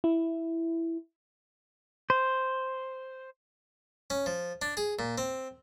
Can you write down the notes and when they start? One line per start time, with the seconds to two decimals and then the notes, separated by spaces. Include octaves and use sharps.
0.04 E4
2.10 C5
4.10 C#4
4.26 F3
4.62 D4
4.77 G#4
4.99 A#2
5.18 C4